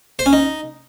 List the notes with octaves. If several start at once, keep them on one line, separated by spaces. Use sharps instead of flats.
C5
C#4
D#4